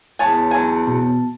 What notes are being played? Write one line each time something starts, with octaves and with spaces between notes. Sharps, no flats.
E2 B3 C#5 G#5 A5 A6
F#3 G#5
B2